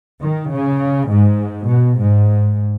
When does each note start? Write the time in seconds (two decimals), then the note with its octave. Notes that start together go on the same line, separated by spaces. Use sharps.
0.22 D#3
0.51 C#3
1.10 G#2
1.68 B2
1.98 G#2